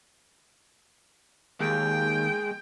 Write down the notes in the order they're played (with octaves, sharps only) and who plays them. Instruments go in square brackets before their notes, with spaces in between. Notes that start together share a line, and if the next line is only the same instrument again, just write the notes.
[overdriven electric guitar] D#2 [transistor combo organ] G#3 [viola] G5